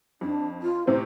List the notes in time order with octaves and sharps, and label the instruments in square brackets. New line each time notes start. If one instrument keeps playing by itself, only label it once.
[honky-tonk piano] F2 [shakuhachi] D4
[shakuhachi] F4
[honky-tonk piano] A2 C3 C4 [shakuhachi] C5